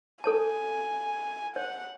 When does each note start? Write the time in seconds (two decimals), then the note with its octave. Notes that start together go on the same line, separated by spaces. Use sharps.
0.24 A4 C#5 G#5 A5
1.56 C#5 F#5